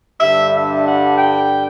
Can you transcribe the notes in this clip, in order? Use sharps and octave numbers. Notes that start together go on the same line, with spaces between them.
G2 D3 G3 E5
E5
F#5
G5